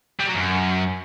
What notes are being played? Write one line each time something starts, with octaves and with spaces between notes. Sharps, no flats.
G3
F#3
F#2